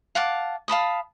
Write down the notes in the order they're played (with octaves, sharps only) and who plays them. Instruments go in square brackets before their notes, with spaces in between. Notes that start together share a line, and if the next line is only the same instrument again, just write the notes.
[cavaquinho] F5 F#5 A5 D6
F5 A5 B5 D#6